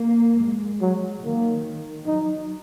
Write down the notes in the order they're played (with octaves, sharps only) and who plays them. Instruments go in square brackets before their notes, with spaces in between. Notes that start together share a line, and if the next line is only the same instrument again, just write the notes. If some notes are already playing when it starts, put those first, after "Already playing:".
Already playing: [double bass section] A#3
G#3
[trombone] F#3
[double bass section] D#3 [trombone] A#3
[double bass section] F#3 [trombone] D#4